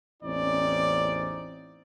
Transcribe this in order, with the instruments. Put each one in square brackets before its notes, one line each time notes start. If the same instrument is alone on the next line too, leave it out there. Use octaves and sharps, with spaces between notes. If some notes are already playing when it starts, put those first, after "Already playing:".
[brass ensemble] A1 E2 C4 C#4 D#4 D5